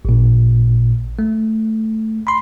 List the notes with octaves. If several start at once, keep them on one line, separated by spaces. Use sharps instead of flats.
A1 A#2
A3
B5 C6